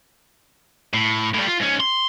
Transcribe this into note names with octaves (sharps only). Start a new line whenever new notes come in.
A2
A2 G3
F4
G#2 C#4
C6